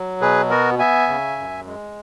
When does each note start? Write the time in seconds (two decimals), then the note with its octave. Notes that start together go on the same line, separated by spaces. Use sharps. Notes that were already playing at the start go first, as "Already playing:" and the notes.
Already playing: F#3
0.21 B2 G#4 B4
0.50 B3 F#4 A#4
0.79 B3 E5 G#5
1.08 C#3
1.37 F#2
1.66 G#3